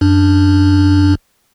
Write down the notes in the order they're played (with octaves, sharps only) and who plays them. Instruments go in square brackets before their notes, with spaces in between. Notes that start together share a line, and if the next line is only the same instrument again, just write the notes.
[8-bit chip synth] F#2 D4